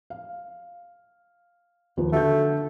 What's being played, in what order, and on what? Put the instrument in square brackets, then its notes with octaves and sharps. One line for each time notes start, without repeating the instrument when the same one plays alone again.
[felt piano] F5
D#2 F3 B4
[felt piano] D3 F#4 G6 [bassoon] A3